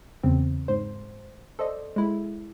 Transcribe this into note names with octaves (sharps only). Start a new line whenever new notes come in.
E2 C#3 C4
G#2 C5
A4 C5 D5 D#5
G#3 E4